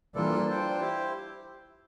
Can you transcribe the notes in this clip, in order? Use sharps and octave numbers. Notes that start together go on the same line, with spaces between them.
E3 G3 A#3 D4 F4 A4 D5
D4 F4 C5 G5
E4 G4 C5